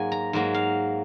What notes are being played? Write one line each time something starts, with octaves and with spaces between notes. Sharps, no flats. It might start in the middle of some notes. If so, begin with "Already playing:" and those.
Already playing: G#2 F#3 A#3 G#5
A#5
G#2 F#3 A#3
F5